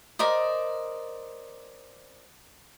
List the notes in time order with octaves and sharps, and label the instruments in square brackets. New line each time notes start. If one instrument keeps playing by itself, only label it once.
[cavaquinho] A#4 C5 D5 D#5